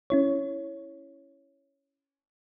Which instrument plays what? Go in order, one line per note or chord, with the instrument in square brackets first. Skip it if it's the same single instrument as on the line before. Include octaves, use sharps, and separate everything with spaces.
[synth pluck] C#4 E4 C#5